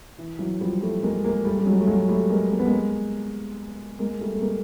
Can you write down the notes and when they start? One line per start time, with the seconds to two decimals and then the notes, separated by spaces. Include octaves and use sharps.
0.18 E3
0.39 E3 F#3
0.61 F3 G3
0.82 G3 A3
1.03 G#3 A#3
1.24 G#3 A#3
1.45 G3 A3
1.59 G3
1.66 F#3 G#3
1.80 A3
1.87 F#3 G#3
2.09 G3 A3
2.30 G#3 A#3
2.52 A#3
2.59 B3
2.66 G#3 A#3
3.99 G#3 A#3
4.20 G3 A3
4.34 A3
4.41 G#3 A#3